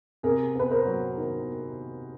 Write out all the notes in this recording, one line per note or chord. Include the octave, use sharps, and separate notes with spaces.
C3 G#4 A#4
B3 B4
A#4 C5
F#3
D#3